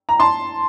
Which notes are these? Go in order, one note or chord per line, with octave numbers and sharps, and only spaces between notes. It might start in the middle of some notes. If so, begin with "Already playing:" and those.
A#5
A5 C6